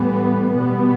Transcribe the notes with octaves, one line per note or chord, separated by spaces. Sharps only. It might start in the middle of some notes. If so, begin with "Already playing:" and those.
Already playing: A2 E3 G3 B3
B2 G3 B3